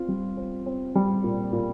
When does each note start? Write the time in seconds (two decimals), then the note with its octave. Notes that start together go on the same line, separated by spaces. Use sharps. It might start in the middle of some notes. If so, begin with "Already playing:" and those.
Already playing: C4 F4
0.08 G3
0.37 C4
0.66 C4
0.95 G3
1.24 A#2
1.53 A#2